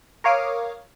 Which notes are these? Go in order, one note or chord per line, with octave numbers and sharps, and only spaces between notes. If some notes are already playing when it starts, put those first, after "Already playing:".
A#4 C#5 F5 D6 D#6 F6